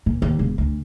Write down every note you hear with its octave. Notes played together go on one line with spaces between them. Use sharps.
A#2
D#2
E1
D2